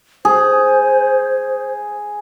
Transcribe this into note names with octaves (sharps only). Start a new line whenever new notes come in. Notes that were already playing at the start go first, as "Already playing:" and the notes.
G#4 C5